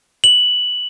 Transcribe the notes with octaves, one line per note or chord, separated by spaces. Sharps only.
F#7